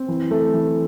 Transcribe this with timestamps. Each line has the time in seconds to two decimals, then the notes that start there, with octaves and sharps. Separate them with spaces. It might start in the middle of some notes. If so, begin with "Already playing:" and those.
Already playing: C4
0.08 E3
0.31 A3
0.53 E3